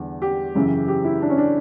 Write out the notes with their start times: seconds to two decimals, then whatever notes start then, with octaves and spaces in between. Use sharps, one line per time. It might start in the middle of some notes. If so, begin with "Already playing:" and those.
Already playing: E2 D3 G3
0.22 G4
0.55 F#2 C#3 E3
0.88 G4
1.05 E4
1.22 D4
1.30 C#4
1.38 D4